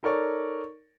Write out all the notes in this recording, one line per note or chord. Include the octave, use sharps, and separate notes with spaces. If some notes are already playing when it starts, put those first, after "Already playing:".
D#4 A4 A#4 C#5 D5 C#6